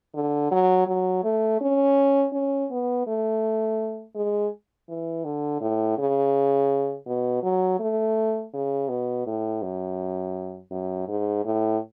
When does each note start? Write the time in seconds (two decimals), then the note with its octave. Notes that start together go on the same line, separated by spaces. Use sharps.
0.15 D3
0.51 F#3
0.87 F#3
1.24 A3
1.61 C#4
2.33 C#4
2.70 B3
3.07 A3
4.15 G#3
4.89 E3
5.25 D3
5.61 A2
5.98 C#3
7.07 B2
7.43 F#3
7.80 A3
8.54 C#3
8.89 B2
9.27 A2
9.62 F#2
10.71 F#2
11.08 G#2
11.45 A2